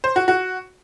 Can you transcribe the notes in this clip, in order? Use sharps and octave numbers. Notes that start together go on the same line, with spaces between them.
C5
F#4
F#4